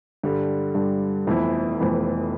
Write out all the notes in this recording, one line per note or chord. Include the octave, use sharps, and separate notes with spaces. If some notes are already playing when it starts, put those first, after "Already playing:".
G2 D3 G3
G2 D3 G3
F1 F2 E3 B3 E4
F1 F2 E3 B3 E4